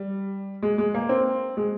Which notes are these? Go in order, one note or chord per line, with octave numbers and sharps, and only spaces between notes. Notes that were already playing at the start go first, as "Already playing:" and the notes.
Already playing: G3
G#3
G#3
A#3
C4
G#3